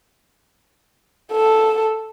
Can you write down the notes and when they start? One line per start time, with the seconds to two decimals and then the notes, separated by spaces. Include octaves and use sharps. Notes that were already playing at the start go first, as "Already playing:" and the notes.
1.32 A4